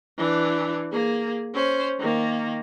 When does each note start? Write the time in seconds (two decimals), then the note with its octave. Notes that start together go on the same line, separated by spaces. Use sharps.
0.18 E3 D4
0.92 A#3 G#4
1.54 C#4 C5
1.99 D#3 A#3